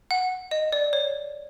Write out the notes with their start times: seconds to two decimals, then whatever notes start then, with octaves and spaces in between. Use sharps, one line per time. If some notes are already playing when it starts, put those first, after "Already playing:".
0.11 F#5
0.51 D#5
0.72 D5
0.93 C#5